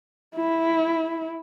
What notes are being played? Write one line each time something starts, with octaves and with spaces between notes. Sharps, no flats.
E4